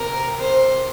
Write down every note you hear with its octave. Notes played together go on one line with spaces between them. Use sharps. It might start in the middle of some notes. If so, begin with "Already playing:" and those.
Already playing: C3 C4 A#4
C5